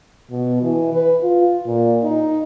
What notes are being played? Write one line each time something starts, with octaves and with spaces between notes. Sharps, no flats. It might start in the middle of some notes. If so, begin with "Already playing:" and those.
B2
E3
B4
F4
A#2
D#4